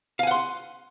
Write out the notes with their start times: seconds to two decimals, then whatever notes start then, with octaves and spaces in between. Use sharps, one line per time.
0.19 F5
0.23 G#5
0.27 F#5
0.31 C6